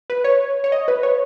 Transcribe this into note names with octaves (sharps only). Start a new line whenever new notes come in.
B4
C#5
C#5
D#5
B4
C#5